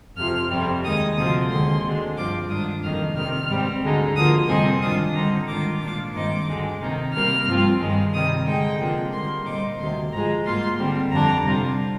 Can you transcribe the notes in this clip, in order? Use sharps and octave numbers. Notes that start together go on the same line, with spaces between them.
F2 C3 F3 F6
F2 C3 G3 C4
D#2 D#3 G#3 D#4 D#6
D2 C3 F3 C4 F4 D#6
D#2 D3 G#3 C4 C6
D2 D3 G#3 D4
G2 F3 C4 F4 D6
G#2 D#3 G3 D4 F4 D#6
F2 C3 D#3 A#3 F6
C3 D#3 G3 F6
G#2 G3 C4
D2 D3 G#3 D#4
D2 D3 F3 A#3 D#6
F2 C3 G3 C4 D#4 G#5
G#2 D#3 G3 D4 F4 D#6
D3 G3 C4 D#4 A#5
G#2 D#3 G#3 D4 F4 D6
A#2 G#3 D4 F4 D6
G2 D#3 G#3 C4 D#4 D6
D2 D3 G#3
C3 D#3 A#3 D#4
C3 G3 A#3 F6
G2 F3 C4 F4
G2 D#3 G#3
C3 D#3 G3 D#6
D3 G#3 D#4 G5
C3 F3 A#3 D4
D3 G3 A#3 C6
A#2 G3 C4 D#4 D6
D2 C3 D#3 C6
G#2 F3 G#3 A#5
G#2 G3 A#3 F4 C6
D3 G3 C4
F2 D3 G3 D4 A#5
C3 G3 D4 F4